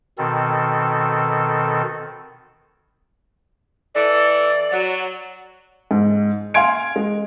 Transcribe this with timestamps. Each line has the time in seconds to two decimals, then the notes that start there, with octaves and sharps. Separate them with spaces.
0.18 B2 D#3 C4 A4
3.95 E3 A4 D5
4.72 F#3
5.91 G#2
6.54 F5 F#5 G#5 C6 G#6 D7
6.96 G#3